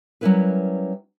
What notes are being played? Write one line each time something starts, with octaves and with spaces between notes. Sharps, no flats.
F#3 G3 C#4 E4 A#4 B4